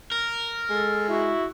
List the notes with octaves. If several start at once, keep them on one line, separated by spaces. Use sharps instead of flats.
A#4
G#3 A4
E4 F#4